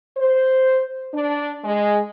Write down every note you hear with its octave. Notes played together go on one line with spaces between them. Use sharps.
C5
D4
G#3